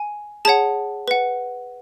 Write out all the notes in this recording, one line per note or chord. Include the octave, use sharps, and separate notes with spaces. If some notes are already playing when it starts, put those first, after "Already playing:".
Already playing: G#5
G#4 C#5 F#5 A5
B4 F#5